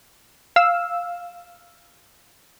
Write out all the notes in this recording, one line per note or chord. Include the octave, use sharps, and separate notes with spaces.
F5 E6